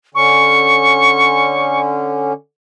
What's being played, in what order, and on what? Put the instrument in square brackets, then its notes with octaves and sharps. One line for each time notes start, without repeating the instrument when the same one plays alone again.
[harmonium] D3 C#4 [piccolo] C#6